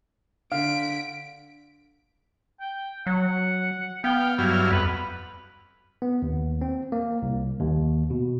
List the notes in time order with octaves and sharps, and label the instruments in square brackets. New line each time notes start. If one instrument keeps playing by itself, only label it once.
[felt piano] D3 [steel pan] F5 [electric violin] B6 D7
[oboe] G5
[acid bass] F#3 [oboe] F#5
[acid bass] B3 [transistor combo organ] F5 [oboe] G5
[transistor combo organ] G2 F#3 F6 [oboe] E4
[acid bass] F2 [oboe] B4
[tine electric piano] B3
D#2
C4
A#3
C2
D#2
B2